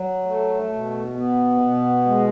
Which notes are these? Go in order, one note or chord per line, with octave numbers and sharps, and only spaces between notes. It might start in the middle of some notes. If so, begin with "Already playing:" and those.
Already playing: F#3
A3
B2
B3
B2
G#3